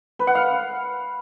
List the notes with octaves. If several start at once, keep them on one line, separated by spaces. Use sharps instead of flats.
B4
F#5
F5